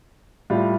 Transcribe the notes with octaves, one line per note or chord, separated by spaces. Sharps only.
A2 G3 F4